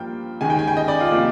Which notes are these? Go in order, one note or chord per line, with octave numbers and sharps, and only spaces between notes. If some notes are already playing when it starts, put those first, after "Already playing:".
Already playing: G2 F3 A#3 G5
D#2 D#3 G#3 G#5
G5
G#5
G5
D#5
D5
F4
C3 F3 A#3